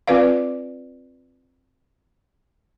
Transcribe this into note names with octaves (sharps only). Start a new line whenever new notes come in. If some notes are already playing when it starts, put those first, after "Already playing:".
C4 F4 B4 D5 F5